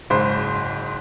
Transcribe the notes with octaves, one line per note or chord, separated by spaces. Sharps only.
F#1 G#2 C5 B5